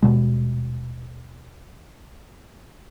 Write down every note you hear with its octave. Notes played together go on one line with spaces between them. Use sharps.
D#1 B2 G#3